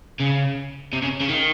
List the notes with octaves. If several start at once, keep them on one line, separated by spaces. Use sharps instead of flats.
C#3
C3
C#3
C#3
D#3